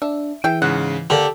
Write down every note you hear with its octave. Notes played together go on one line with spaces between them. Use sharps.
D4 E5
E3 G#4 E5 G5
G#2 C#3 F#5
D3 A#3 G4 A4 A5